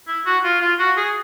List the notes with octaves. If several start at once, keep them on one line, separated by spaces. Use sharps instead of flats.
E4
F#4
F4
F4
F#4
G#4